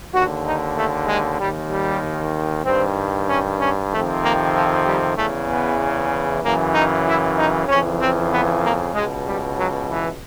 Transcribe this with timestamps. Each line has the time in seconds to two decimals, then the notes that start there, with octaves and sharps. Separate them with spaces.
0.12 D#2 D3 F#4
0.45 D#4
0.75 A3
1.07 G#3
1.39 D#2 D#3 G3
1.69 G3
2.64 G2 D#3 C4
3.28 C#4
3.59 C#4
3.90 F2 C3 D#3 A3
4.22 A#3
4.53 F3
4.85 G3
5.16 E2 C#3 E3 A3
5.48 B3
6.42 F#2 C#3 E3 A#3
6.73 D#4
7.06 E4
7.36 D#4
7.67 F2 C#3 E3 C#4
7.99 C4
8.31 B3
8.62 A#3
8.93 C#2 B2 G#3
9.26 G3
9.56 F#3
9.88 E3